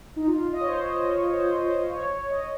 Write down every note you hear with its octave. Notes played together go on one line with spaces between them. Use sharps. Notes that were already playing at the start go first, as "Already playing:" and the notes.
D#4
F4
D#5
C#5
C5
D#5
C#5
C5
C5
C#5
D#5